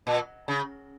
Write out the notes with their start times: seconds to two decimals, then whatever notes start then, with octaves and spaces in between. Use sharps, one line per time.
0.07 A#2
0.48 C#3